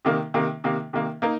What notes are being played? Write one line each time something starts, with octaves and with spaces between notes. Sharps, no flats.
C3 D#3 A#3
C3 D#3 A#3
C3 D#3 A#3
C3 D#3 A#3
A#3 D#4 A#4